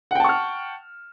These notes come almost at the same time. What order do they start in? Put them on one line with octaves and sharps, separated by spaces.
F#5 G5 A5 C#6 F6